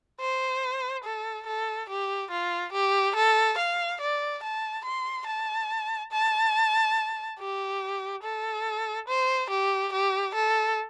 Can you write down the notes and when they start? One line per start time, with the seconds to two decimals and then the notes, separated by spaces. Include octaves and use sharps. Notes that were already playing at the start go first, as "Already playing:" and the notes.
0.20 C5
1.04 A4
1.47 A4
1.89 G4
2.30 F4
2.73 G4
3.16 A4
3.58 F5
4.01 D5
4.43 A5
4.85 C6
5.27 A5
6.12 A5
7.39 G4
8.23 A4
9.08 C5
9.50 G4
9.92 G4
10.34 A4